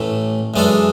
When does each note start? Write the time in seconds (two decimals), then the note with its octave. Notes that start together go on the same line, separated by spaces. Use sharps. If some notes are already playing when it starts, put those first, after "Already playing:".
Already playing: A1 A2 E3 A3
0.54 F#2 E3 G#3 D4 A4